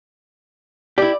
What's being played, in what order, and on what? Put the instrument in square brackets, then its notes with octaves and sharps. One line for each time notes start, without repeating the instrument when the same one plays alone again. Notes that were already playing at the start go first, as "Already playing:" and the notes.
[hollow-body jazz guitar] E4 G4 [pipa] D5